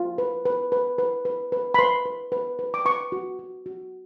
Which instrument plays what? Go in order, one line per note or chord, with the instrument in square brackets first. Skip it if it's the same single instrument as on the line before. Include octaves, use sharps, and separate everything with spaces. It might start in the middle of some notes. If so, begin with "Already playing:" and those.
Already playing: [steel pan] F4
B4
B4
B4
B4
B4
B4
B5
B4 C6
B4
B4
B4
D6
B4 C#6
F#4
F#4
F#4